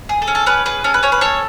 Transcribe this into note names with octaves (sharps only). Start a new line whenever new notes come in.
G#4
A4
C#4
A4
C#4 B4
G#4 B4
C#4 A4
B4
C#4 C#5
B4
A4 C#5